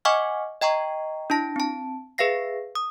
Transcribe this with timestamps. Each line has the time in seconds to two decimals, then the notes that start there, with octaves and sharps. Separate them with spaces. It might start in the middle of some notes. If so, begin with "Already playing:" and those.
0.05 D#5 F#5 G#5 C#6 D6 F6
0.61 D#5 G5 A#5 C#6
1.30 D4 E4 A5 A#6
1.56 C4 A5
2.18 G#4 B4 E5 F5 A#6 C7
2.75 D#6